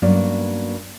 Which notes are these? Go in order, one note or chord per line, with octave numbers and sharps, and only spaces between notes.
G2 F#3 A#3 B3 C#4 D5